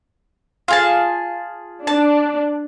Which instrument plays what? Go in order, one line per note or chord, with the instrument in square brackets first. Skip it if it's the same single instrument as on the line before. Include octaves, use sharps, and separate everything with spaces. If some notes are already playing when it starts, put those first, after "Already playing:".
[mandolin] F4 G#4 A5
[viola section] D4 [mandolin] A5